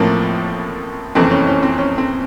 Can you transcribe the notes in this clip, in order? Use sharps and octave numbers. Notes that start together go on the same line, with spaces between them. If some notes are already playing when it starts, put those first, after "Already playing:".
Already playing: A1 A2 F3 A#3 C4
F#1 F2 C3 E3 A3 C4
C#4
C#4
C4
C#4
C4